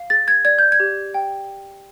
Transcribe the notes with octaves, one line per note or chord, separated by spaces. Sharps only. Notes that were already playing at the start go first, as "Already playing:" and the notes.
Already playing: F5
G#4 A6
G#6
D5 G#6
G6
G#6
G4
G5